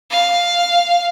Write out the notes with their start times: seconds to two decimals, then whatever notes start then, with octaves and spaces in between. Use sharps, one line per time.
0.10 F5